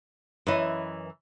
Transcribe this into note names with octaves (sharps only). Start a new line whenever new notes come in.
F#2 E3 B4 C#5 D#5